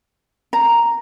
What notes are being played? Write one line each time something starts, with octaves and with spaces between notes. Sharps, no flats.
A#5